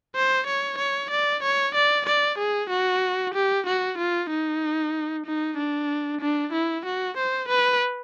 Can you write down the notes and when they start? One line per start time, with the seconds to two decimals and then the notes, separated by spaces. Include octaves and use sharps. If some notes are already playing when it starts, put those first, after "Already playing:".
0.15 C5
0.47 C#5
0.78 C#5
1.10 D5
1.43 C#5
1.75 D5
2.06 D5
2.38 G#4
2.70 F#4
3.34 G4
3.66 F#4
3.98 F4
4.30 D#4
5.26 D#4
5.57 D4
6.21 D4
6.53 E4
6.85 F#4
7.17 C5
7.48 B4